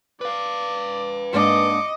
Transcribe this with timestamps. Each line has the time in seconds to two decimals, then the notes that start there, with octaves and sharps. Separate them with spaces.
0.21 B4 D5 F5
1.33 G#2 A#3 D4 D#5 D6 C#7